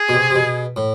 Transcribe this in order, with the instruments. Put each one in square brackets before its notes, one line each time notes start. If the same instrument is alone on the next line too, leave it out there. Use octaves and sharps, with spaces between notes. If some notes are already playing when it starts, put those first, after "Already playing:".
Already playing: [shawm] G#4
[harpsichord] B2
C3
C3
B2
A2